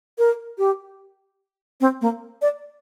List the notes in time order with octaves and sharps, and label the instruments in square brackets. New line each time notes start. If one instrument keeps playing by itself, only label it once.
[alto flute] A#4
G4
C4
A#3
D5